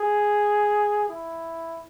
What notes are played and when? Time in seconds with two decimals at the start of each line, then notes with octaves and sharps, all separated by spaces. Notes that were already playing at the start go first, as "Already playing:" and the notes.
Already playing: G#4
1.09 E4